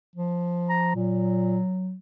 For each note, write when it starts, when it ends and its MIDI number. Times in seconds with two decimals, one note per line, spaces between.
0.15 0.90 53
0.69 0.94 82
0.95 1.60 46
0.95 1.96 54